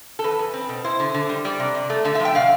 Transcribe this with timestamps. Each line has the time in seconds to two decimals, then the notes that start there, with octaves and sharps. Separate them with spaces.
0.19 A4
0.24 E2 B4
0.39 E2
0.54 C4
0.69 B2
0.84 E4 C5
1.00 D3
1.14 D3
1.29 G3
1.45 G3 D5
1.60 C3
1.75 C3
1.90 A3
2.05 D3 E5
2.15 E5
2.20 F3
2.25 G5
2.35 B2 F5